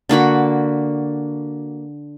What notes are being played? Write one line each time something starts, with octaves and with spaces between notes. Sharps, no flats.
D3 A#3 F#4 B5